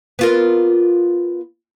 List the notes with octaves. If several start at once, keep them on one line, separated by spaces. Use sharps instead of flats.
B3 F4 A#4